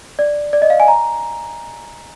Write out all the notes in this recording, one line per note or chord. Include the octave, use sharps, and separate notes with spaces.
D5
D5
D#5
F5
G#5
A#5